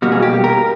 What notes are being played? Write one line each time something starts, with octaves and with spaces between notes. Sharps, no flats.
B2 G3 A#3 F#4
G#4
G4
A#4